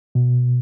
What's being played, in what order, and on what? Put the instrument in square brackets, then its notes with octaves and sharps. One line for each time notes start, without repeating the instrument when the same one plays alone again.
[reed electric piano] B2